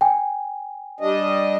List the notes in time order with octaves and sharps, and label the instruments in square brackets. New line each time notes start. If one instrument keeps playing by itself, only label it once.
[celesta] G5 G#5
[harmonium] G3 D4 D#5